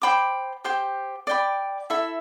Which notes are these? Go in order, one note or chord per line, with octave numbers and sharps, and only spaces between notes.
C5 G5 B5 D6
G4 C5 G5
D5 G5 B5
E4 A4 E5